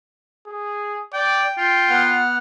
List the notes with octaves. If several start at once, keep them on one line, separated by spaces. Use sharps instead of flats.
G#4
D5 G5
F4 G5
B3 F#5 F6